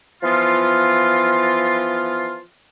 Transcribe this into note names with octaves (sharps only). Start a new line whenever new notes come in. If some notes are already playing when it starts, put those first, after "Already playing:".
E3 F3 B3 F4